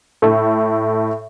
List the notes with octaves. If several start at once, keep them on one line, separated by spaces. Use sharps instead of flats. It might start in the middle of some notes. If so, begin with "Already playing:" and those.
A2 A4